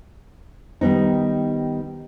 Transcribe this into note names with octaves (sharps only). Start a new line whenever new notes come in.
D#3 G3 B3 D#4